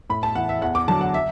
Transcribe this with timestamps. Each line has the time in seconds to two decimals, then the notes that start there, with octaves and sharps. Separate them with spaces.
0.10 A2 B5
0.23 A5
0.35 E3 F#5
0.49 E5
0.61 E2 F#5
0.75 D6
0.88 D3 F#3 A5
1.01 F#5
1.14 E5